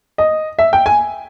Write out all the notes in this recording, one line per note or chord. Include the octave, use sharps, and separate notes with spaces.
D#5
E5
G5
G#5